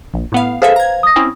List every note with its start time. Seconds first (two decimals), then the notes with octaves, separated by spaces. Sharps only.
0.14 A#1
0.32 A2 B3 F5
0.62 G#4 A4 B4 C5 E5 F5
0.76 A#5 G#6
1.03 D#6 A#6
1.16 C4 C#4 E4